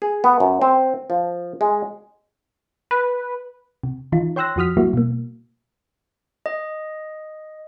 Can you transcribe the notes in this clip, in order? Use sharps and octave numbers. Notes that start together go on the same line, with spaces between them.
G#4
B3
F#2
C4
F3
G#3
B4
C3
D#3 E3 D#4 F4
C#5 G5 C6 E6 F#6 A#6
F2 F3 F#4 D#6 F6 B6
F#3 G3 A#3 E4 F#4
B2 A#3
D#5